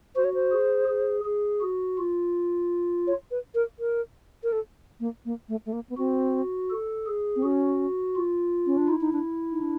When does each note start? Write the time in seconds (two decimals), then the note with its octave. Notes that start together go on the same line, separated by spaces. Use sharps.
0.16 F#4 C5
0.25 C#5
0.34 C5
0.52 G#4
0.89 G#4
1.25 G#4
1.61 F#4
1.98 F4
3.07 C#5
3.31 B4
3.55 A#4
3.79 A#4
4.44 A#4
4.52 A4
5.00 A#3
5.25 A#3
5.49 A3
5.66 A3
5.73 A#3
5.90 B3
5.97 C4 F#4
6.70 A4
7.07 G#4
7.36 C4
7.43 C#4 F#4
8.16 F4
8.66 C#4
8.77 D4
8.88 D#4 E4
9.01 D#4
9.13 D4
9.52 D#4
9.62 D4